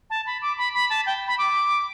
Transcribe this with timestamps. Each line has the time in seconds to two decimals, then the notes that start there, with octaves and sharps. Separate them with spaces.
0.10 A5
0.26 B5
0.41 D6
0.58 B5
0.74 B5
0.90 A5
1.06 G5
1.28 B5
1.38 D6